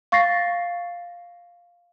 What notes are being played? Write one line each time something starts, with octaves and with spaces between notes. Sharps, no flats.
F5 C#6 A6 A#6 C7